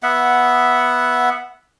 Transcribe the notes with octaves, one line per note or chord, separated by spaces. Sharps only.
B3 E5 F#5